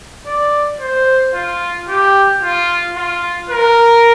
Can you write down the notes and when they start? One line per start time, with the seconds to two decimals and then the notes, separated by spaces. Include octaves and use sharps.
0.27 D5
0.80 C5
1.34 F4
1.89 G4
2.42 F4
2.97 F4
3.50 A#4